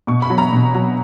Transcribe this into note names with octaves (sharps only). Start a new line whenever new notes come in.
B2 C#6
B5
F#3
A#5
B2
F#3